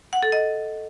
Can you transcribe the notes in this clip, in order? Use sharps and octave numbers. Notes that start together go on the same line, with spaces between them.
F#5
A4
D#5